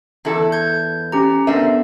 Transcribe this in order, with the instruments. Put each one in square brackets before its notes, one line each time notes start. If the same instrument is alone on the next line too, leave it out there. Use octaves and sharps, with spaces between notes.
[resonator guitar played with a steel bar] E2 E4 A4
[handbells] G6 G#6
C#4 G4 A#5
[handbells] B3 D4 A4 [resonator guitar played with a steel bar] A#4 C5 E5